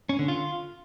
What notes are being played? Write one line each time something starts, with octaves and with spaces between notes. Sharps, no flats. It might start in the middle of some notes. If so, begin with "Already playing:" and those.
C#4
D3
F4